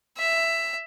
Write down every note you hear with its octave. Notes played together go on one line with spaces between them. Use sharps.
E5